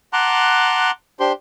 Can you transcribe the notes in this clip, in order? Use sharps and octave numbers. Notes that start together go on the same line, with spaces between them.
F#5 A5 A#5 C6 D6 F#6
D4 G4 C5 C6